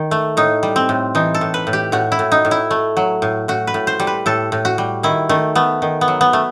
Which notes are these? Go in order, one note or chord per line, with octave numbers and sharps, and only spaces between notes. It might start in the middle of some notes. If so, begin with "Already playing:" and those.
Already playing: D#3
A3
A2 D#4
G3
C4
A2
E3 D#4
A4
A2
B4
A2
G4
A2 F#4
E4
A2
D#4
A2
E4
A3
F#3
A2
A2 F#4
B4
A2
C5
G3
B4
A2 A4
A2
F#4
G3
D#3 E4
D#3 A3
A3 B3
D#3
B3
F#3
B3
A3